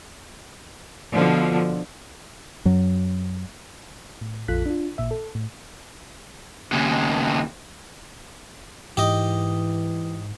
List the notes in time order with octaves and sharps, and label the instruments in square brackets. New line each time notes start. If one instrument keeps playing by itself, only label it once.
[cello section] B2 D3 F3
[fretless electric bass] F#2 F#3
[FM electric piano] A2
A#1 F2 F4 A4 F#6 B6
D4 F4
A1 A#2 E5
A4
A2
[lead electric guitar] D#2 C#3
[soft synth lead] G#2 [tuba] E3 [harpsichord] G4 D#5